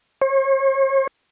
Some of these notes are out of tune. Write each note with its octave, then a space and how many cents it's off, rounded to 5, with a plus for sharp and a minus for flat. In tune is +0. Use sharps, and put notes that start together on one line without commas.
C#5 -45